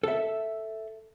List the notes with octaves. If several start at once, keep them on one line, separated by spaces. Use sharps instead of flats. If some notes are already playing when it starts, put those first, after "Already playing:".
A4 E5